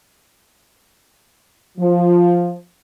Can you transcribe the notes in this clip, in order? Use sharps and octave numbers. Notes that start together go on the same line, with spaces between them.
F3